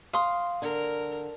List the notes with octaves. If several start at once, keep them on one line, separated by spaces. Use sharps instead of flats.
F5 C6 D#6
D3 A#4